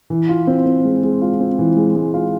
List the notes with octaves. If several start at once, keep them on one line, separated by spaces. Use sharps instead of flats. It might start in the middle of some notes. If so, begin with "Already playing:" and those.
E3
F4
C4
C4
G#3
G#3
F4
C4
E3
G#3
G#3
F4